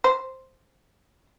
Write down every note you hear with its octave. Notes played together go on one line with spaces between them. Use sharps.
C5